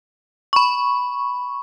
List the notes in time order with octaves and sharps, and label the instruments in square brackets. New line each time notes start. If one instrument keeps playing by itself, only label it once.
[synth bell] B5 C#6